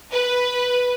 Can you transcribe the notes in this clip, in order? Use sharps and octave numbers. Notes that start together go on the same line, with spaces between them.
B4